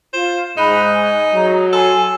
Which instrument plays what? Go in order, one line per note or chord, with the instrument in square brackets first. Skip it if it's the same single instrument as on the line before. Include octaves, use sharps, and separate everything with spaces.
[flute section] F4 [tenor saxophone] C5
[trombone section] G#2 [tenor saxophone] D#4 [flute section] B5 F#6
[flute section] G#5
[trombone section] F#3 [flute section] G#4 A#5
[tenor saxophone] A4 [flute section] G#5 C6